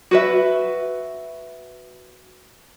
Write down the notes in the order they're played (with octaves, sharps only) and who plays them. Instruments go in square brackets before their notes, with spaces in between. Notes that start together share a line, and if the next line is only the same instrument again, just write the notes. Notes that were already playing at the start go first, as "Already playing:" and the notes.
[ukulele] F#4 B4 E5